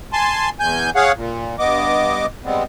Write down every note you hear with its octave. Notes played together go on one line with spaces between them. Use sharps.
G#5 A5 C6
E2 G#5 G6
G#4 C#5 F5 F#5
A#2
G2 B3 D#5 D6
G3 G#3 B3 C4